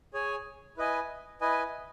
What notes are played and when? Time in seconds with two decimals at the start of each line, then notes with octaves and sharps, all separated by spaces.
0.14 G#4 C#5 G#5
0.77 E4 B4 D#5 G#5
1.41 E4 B4 D#5 G#5